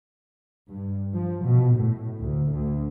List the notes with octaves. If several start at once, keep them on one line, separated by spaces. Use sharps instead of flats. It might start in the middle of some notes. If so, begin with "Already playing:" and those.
G2
F3
B2
A2
D2
D2